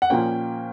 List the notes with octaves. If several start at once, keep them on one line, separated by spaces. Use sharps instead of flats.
F#5
A#2 F3 A#3 C#4 G5